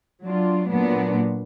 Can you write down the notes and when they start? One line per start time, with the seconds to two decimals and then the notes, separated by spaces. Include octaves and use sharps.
0.24 F#3 D4 F4
0.70 A#2 F#3 B3 D4